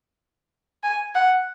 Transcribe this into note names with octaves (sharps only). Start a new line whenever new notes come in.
G#5
F#5